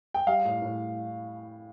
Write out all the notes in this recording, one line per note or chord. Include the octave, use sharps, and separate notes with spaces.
G5
G3 F5
A2
A2